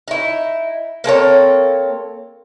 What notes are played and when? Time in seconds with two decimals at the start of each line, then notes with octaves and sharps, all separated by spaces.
0.08 D#4 E4
1.04 A#3 C4 A4 C#5